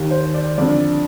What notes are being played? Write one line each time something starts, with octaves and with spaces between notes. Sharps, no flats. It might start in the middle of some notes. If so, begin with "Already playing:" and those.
Already playing: D#2 D#3
C5
D5
F2 D3 D5